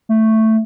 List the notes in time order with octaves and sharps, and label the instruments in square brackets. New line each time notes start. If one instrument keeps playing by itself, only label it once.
[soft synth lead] A3